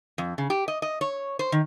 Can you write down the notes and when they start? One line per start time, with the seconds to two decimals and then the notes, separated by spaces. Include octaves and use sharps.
0.18 F2
0.38 C#3
0.50 G4
0.68 D#5
0.82 D#5
1.01 C#5
1.39 C5
1.52 D#3